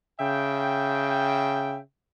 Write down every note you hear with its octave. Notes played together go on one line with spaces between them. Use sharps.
C#3 E5 G5